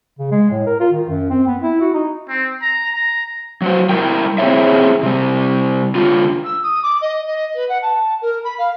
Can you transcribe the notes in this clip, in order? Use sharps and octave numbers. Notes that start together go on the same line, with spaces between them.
C#3
G#3
A2
A#4
F4
D#3
F#2
C4
B3
E4
F#4
D#4
C4
A#5
A#5
F#3 F#4 C5
G3 G#3 E4 A#4 G5
C4 E4 G#4 C5 C#5 E5
C3 G3
D3 F4
E6
D#6
D6
D#5
D#5
B4
F#5
A5
A#4
B5
F5